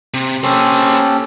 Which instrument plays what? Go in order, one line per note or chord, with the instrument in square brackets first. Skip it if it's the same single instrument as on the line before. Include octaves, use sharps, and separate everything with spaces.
[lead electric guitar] C3
[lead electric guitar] A#3 C5 [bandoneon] C#4 G4 A4